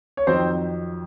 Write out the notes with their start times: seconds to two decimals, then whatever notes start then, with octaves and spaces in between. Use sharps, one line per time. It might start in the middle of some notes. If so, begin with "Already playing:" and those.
0.17 C#5
0.27 F2 D#3 F#3 C4 C5